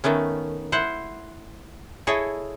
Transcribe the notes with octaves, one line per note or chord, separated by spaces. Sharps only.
D#3 A3 B3 C#4
E4 C5 F#5
E4 G#4 A4 C#5 D#5